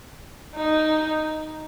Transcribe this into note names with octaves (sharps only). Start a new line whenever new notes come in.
D#4